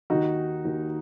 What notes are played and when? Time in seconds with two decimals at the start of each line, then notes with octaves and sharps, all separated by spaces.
0.10 D#2 D#3 D#4 F#4
0.65 D#2 D#3